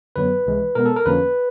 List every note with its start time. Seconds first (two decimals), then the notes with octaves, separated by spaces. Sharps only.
0.16 F#2 D3 F#3 B3 B4
0.46 C2 C3 E3 G#3
0.75 B2 G#3 B3 A#4
0.86 A4
0.96 A#4
1.06 F2 D3 F3 A#3 C#4 B4